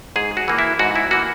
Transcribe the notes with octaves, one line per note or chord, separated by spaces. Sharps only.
G#2 G#4
F#4
E3 A#3
E4
G#2 F#4
E4
E3 A#3 F#4